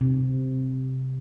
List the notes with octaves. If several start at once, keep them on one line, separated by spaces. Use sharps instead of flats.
C3